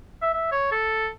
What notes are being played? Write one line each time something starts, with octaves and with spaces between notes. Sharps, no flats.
E5
E5
C#5
A4